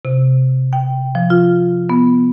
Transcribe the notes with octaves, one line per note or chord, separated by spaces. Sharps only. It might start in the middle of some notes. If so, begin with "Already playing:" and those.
C3
G5
F3
F4
B3